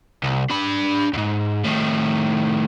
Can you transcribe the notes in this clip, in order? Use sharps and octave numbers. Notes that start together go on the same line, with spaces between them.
C2
D4 B5
D2 G#2
A2 D#3